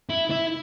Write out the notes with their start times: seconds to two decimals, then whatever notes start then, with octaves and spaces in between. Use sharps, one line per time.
0.10 E4
0.31 E4